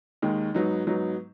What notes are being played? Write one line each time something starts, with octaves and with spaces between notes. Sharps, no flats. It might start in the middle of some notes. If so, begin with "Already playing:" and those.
D#2 D#3 G#3
G#2 F#3 B3 D#4
G#2 F#3 B3 D#4